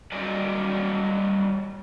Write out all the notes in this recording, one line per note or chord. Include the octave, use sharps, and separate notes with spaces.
F#3 G3 A#4 D5 D#5